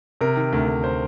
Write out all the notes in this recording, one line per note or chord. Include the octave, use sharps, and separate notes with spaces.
C3 A#4
D#3
D2
D2
C5